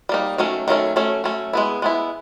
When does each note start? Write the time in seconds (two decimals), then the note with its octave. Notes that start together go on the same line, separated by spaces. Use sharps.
0.09 G3 A#3 D#4
0.38 D#3 F#3 A3 C#4
0.68 D#3 F#3 A3 C#4
0.96 F#3 A3 C#4
1.24 F#3 A3 C#4
1.53 G#3 B3 E4
1.82 G#3 B3 E4